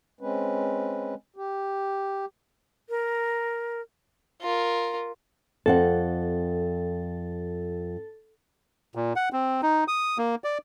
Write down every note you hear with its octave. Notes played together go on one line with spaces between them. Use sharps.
G#3 C4 C#4 B4
G4
A#4
F4 A#4
F2 C4 A4 F#5
A#2
F#5
C4
D#4
D#6
A#3
D5